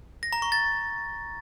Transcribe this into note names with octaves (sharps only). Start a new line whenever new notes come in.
A#6
A#5
C#6
A6